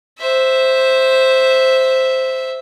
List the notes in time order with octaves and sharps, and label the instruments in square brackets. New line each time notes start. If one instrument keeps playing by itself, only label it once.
[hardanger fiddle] C5 E5